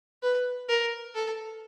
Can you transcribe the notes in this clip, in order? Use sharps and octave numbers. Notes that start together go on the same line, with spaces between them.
B4
A#4
A4